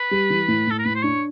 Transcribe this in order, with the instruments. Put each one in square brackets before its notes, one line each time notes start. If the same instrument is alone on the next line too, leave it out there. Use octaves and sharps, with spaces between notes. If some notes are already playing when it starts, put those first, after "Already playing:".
Already playing: [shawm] B4
[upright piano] G3
E3
A2
[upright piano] A2 [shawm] A4
[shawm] A#4
[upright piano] A2 [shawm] B4
[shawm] C5
[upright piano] D4 [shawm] C#5